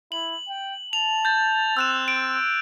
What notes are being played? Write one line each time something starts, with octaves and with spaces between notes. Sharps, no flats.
E4 F#7
G5
A5 F7
G6 A6
C4 E6 F#6 E7
D7